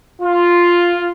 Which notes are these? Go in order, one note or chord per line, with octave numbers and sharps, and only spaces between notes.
F4